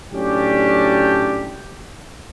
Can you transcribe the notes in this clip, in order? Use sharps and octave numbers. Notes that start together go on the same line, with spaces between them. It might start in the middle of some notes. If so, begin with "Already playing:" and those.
A2 F#3 C#4 D4 G4